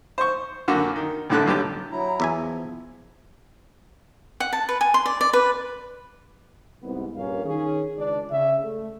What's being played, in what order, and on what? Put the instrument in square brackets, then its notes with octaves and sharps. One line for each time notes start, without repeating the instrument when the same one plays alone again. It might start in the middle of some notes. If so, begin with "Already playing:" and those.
[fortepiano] C5 C#6
F#2 D3 A#3 F#4
D#3
C2 A2 D3 A4 F#6
G2 B2 D3 F#3 G4 D6
[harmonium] F#3 E4 A#5
[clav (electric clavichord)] E2 E5 G#5
[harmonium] F3
[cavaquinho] F#5
A5
B4
G#5
C6
D5
D5
B4
[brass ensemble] C2 G#2 B3
A#1 G2 A#2 C#4 A#4 F5
D#3 C#4 G#4
C#2 D4 D5
C#3 E5
A3